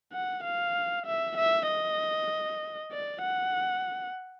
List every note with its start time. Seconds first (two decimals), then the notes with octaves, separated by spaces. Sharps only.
0.13 F#5
0.44 F5
1.06 E5
1.37 E5
1.68 D#5
2.92 D5
3.23 F#5